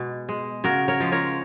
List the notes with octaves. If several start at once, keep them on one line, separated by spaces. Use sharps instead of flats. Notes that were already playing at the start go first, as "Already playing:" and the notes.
Already playing: B2 G#3
G#3
C#3 F#4 A#4
A#4 C#5
F3 G#3
A#4 C#5